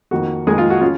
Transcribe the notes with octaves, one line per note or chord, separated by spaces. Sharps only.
F2 D#3 A#3 F#4
F2 D#3 G#3 A#3 G#4
F4
F#4
C#4 F4